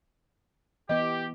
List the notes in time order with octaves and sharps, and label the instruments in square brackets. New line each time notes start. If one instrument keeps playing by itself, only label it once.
[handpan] E3 B3 [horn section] G4 [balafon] D#5